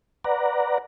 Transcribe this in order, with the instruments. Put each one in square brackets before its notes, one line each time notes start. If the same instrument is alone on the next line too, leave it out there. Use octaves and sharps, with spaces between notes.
[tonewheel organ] B4 D5 F#5 A#5